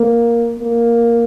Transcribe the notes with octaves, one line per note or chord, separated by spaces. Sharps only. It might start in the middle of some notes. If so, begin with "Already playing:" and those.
Already playing: A#3
A#3